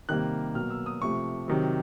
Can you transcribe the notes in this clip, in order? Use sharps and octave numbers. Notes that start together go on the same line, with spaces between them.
C3 D#3 G3 A#3 F#6
B2 F#3 A#3 F6
E6
D#6
C3 F3 A3 C#6
C3 D#3 F#3